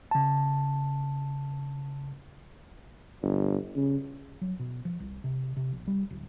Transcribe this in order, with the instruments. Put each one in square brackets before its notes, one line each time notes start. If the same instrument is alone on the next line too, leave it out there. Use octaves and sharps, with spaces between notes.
[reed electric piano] C#3 A5
[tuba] G1
C#3
[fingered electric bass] F#3
B2
F3
C2
C3
C3
A#1
G3
D1